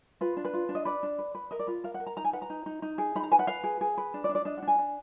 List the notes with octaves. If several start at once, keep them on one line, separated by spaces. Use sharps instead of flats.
F4 B4
D4
B4
F4
D4
D#5
B4 D5
D4
B4
B4
A#4 D#5
D5
F4 B4
A#4 F5
F#5
A#4
A#5
D#4 A#5
G#5
B4 F#5
A#5
D#4
D#4
D#4
G#4
D#4 B5
A#5
B4 G#5
F#5
B4 F5
G#4
G#4
B4
D4
D5
D4
D5
D4 D#5
F#5
D4
G#5
D4